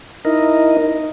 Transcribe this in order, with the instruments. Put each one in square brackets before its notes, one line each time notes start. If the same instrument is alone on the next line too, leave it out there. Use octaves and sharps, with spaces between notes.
[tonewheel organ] D#4 E4 A#4 D#5